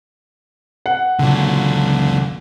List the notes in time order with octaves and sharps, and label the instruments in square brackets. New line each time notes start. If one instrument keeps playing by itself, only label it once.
[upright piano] F#5
[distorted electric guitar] C#2 F#3 [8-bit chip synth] A#2 D3